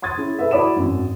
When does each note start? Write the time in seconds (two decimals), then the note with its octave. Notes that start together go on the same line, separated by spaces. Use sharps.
0.02 C6 D#6 G#6 A6
0.17 C#4 E4 G#4
0.39 A4 B4 E5
0.51 E4 F#4 D5 B5 D#6 E7
0.76 G#1 F#2